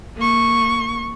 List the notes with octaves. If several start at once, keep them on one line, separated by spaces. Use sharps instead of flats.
A#3 C#6